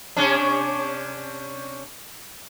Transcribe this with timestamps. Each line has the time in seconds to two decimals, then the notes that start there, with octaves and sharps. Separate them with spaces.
0.17 C3 C#4 D4